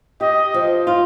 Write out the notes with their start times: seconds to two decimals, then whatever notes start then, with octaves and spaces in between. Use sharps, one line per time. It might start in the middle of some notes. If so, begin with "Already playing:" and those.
0.21 G4 D#5
0.54 F3
0.87 F4